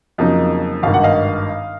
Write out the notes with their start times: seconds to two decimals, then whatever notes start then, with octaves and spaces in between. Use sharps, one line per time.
0.18 F2 C#3 F#3 A#3 D#4
0.83 G#1 G2 D#3 F5
0.94 F#5
1.03 D#5 F5